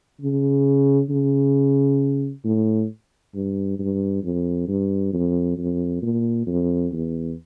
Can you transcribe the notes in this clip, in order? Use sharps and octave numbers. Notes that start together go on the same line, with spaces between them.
C#3
C#3
A2
G2
G2
F2
G2
F2
F2
A#2
F2
E2